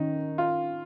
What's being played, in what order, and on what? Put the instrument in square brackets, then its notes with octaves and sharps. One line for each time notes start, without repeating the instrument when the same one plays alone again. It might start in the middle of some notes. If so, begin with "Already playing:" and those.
Already playing: [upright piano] D#3 C#4 [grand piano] D#4
[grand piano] F4